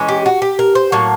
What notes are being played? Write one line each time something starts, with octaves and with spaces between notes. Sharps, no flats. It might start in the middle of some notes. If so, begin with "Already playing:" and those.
Already playing: E3 G#3 C#4
G4
F#4
G4
A#4
C5
A2 F#3 A#3 C#5